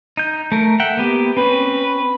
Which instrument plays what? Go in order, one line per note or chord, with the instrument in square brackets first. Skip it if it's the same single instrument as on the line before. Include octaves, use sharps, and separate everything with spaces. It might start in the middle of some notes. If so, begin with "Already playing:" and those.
[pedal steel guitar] D#4 G6
A3 A#4
E5 F#5 G5
A#3 B3 G4
[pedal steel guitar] C4 C#4 [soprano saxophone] B4